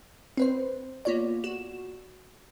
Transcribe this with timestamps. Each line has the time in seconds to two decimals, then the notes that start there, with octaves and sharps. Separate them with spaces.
0.37 C4 B4 C5
1.05 A#3 B3 F4 C#5 D5
1.44 F#4 E7